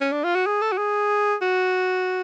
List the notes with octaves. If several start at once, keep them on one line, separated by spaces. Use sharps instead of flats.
C#4
D4
F4
F#4
G#4
A4
F#4
G#4
F#4